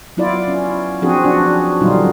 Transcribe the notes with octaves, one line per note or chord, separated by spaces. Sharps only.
F#3 B3 E4 F4 D5
C#4
F3 C4 D4 F#4 G#4
B3 C#4 D4 F#4
A#2 D3 F#3 G3 D#4 F4